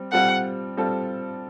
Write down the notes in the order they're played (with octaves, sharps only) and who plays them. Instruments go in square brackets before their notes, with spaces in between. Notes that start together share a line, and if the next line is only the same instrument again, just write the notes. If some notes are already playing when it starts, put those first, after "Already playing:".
Already playing: [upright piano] G3 C4
[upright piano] G3 C4 F4 A4 [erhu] F#5
[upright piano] G3 C4 F4 A4